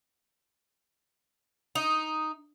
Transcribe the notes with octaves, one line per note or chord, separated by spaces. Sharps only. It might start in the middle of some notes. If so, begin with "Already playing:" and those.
D#4